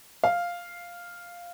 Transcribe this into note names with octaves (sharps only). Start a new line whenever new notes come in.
F5